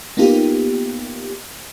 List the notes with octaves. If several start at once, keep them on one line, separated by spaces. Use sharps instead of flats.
A#3 B3 D#4 F4 G4